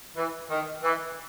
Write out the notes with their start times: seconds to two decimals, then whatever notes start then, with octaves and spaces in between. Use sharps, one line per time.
0.16 E3
0.50 D#3
0.83 E3